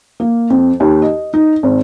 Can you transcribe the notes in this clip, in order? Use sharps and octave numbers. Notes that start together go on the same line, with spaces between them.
A#3
F2
D#2
D#5
D#4
G#1